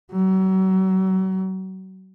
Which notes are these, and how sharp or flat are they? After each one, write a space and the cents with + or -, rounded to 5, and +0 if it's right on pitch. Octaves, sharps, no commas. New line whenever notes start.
F#3 +35